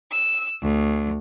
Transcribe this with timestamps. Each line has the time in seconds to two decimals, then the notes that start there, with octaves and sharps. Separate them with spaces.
0.11 E6
0.63 D2